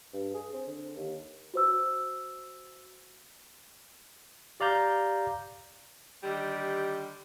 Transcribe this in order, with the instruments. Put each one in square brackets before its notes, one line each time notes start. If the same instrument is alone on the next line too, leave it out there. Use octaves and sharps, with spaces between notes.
[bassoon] G2
G#4
C4
D3
D#2
[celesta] F#4 C5 E6
[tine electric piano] G4 D5 F5 A#5 G6
[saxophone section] D3 D#3 G3 G4